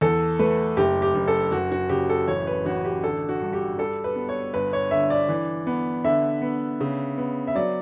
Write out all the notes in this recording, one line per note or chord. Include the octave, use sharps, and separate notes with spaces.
E2 A4
A3 B4
F#1 G4
G4
F#1
A4
F#1 F#4
F#4
C#3 G4
A4
A1 C#5
B4
A1 F#4
G4
D3 A4
F#4
G2
G4
G3 A4
B4
B3
C#5
G1 B4
C#5
D3 E5
D5
E3
B3
D3 E5
B3
C#3
B3
E5
F#3 D5